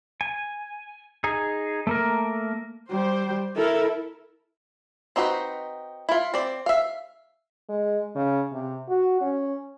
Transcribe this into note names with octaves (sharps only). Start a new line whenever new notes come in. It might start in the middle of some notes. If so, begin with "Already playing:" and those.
G#5
D#4 G#4
A3 A#3 A#4
G3 C5
E4 A4 A#4
C4 D#4 F#4 G#4 B4
E4 F4
C4 D5
E5 F5
G#3
C#3
C3
F#4
C#4